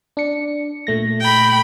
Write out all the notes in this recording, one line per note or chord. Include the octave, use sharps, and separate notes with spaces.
D4 C#7
A#2 A3 A#6
G5 B5